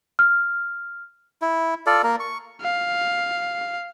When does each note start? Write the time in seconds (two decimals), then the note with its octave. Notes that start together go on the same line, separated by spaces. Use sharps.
0.19 F6
1.42 E4
1.86 F4 A4 D5
2.03 A#3 A#4
2.20 C#6
2.61 F5